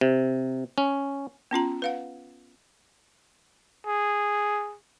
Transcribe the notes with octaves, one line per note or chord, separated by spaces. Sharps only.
C3
C#4
B3 C#4 F4 A#5
B4 F5 F#5
G#4